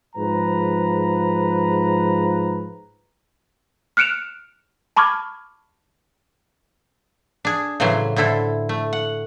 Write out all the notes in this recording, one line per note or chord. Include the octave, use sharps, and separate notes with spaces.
G#2 F3 B4 A#5
F6 F#6 C#7 D7 E7 F7
A5 B5 C#6 D6 F6 G#6
D4 G#4
A2 C#3 E3 F#3 C5 G#5
A2 D3 E4 A4 C5
A3
F#5